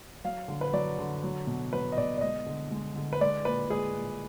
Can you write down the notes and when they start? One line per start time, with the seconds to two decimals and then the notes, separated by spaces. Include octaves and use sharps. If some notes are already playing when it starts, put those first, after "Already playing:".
0.24 F#3 F5
0.48 D3
0.61 B4
0.73 F#3 D5
0.99 D3
1.23 F#3
1.47 B2
1.73 F#3 B4
1.92 D#5
1.97 B2 D5
2.18 D5
2.21 G#3 D#5
2.46 D3
2.71 G#3
2.96 D3
3.13 B4
3.20 G#3 D5
3.45 A#2 B4
3.69 G#3 G#4
3.95 A#2